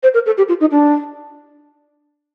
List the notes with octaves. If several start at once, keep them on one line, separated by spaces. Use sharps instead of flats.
C5
A#4
A4
G4
F4
D#4
D4